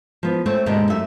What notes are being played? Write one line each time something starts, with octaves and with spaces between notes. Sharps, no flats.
F3 B3
A3 C4 C5 C#5
D#2 G#2 B2 D3 D4 D#5
F#2 A3 E5